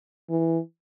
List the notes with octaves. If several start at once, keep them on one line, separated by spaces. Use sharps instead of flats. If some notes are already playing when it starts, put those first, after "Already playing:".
E3